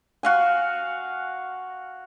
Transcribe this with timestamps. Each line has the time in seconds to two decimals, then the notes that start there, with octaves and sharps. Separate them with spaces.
0.23 F#4 F5 G#5